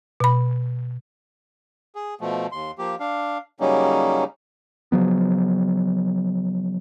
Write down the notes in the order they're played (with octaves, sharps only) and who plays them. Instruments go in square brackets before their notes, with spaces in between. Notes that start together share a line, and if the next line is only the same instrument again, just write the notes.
[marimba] B2 B5
[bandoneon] G#4
B2 F3 A3
D#2 C6
F3 A#3 G4
D4 F5
C#3 F#3 G3 A#3 C#4 D#4
[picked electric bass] C#3 F3 F#3 B3